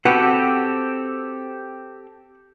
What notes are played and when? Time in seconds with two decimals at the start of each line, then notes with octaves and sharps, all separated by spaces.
0.05 C4 F#4 G4 A4 B4 F#5